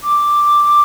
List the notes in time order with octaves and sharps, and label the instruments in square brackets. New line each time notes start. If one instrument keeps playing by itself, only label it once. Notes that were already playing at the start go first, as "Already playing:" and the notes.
[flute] D6